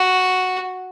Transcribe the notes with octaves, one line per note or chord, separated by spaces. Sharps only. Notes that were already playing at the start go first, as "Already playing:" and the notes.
Already playing: F#4